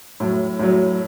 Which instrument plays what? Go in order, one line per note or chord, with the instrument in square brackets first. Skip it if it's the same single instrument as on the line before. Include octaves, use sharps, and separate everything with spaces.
[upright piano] A2 F#3
A2 F#3